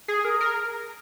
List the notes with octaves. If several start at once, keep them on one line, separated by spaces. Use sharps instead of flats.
G#4
A#4
A#4